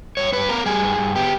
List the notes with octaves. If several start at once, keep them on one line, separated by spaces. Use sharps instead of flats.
G2 C#5
G2 B4
B3 A#4
G3 G#4
G2
G2
B3 G4